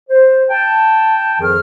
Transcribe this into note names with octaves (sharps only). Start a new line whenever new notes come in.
C5
G5 A5
F2 D#3 F3 G#4 F6